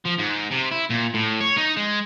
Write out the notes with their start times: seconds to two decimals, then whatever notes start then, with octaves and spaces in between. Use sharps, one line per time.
0.06 F3
0.19 G#2
0.51 C3
0.72 E4
0.90 A#2
1.14 A2
1.41 C#5
1.57 D#4
1.77 G#3